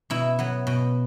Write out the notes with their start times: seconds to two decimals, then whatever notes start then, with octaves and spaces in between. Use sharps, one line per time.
0.10 B2 E4
0.39 F#3 B3
0.67 B2